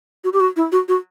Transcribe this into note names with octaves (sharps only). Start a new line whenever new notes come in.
F#4
G4
F#4
E4
F#4
F#4